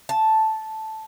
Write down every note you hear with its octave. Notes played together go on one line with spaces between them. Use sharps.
A5